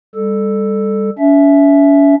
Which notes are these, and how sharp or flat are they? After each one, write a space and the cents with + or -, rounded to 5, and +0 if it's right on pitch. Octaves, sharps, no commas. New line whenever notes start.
G3 +30 A4 +0
C#4 +45 E5 +0